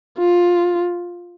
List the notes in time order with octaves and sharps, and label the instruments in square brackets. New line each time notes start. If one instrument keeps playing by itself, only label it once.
[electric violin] F4